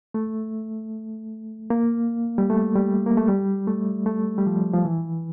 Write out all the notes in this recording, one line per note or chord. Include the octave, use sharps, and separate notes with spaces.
A3
A#3
G3
A3
G3
A#3
A3
G3
A3
A3
G3
F3
F3
E3